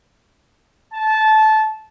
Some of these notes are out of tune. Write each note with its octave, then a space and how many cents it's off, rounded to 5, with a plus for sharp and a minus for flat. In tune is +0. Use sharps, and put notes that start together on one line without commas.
A5 -15